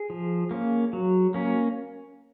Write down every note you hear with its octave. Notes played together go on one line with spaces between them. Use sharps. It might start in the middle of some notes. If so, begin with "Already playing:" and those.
Already playing: G#4
F3
A#3 C#4
F#3
A#3 C#4